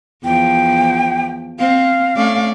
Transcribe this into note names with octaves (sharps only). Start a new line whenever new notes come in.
E2 F3 G5
C4 F5
A3 C#4 D5